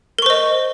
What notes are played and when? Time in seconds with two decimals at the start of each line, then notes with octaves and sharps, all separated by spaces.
0.19 A#4
0.22 C#6
0.26 C5
0.30 D#5